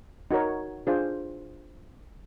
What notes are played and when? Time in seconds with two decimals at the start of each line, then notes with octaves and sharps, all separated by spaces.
0.31 D#4 F#4 A#4 C#5
0.87 D4 F4 G#4 C5